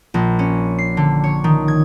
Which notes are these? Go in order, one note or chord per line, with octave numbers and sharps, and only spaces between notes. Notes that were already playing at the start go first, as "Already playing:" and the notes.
A#1
C#4
C7
D3
C#5
D#3
G#6